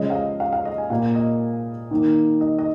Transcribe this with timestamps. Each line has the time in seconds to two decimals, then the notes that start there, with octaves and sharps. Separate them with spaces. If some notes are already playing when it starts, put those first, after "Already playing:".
Already playing: C#3 F3 G#3 D#5
0.10 F5
0.15 D#5
0.40 F5
0.53 F5
0.65 D#5
0.78 G#5
0.90 A#2 A#3 F5
1.15 D#5
1.91 D#3 A#3
2.41 D#5
2.59 D#5